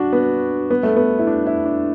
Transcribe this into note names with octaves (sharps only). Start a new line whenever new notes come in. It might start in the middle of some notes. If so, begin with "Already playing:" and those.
Already playing: D4 F#4
B3
B3
A3
B3
E4
D4
E4
D4